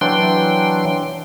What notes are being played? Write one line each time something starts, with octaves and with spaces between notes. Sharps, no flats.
E3 F#3 D4 G5 C6